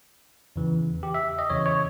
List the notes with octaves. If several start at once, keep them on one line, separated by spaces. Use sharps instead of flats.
E2 C#3 E3
G4
E5
D#5
E2 C#3 E3 C#5
C#5